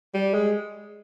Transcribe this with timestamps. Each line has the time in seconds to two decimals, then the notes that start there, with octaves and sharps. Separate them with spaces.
0.14 G3
0.34 G#3